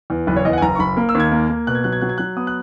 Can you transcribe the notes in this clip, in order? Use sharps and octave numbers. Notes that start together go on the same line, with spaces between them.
E2
F#1 B4
C#5
E2 D#5
F#5
G#5
F#1 A#5
C#6
F#1 B5
A#3
E6
D#2 G#6
A#3
A#3
B2 F#6
G#6
F#3 F#6
G#6
F#3 F#6
G#6
F#3 F#6
B3 D#6
F#6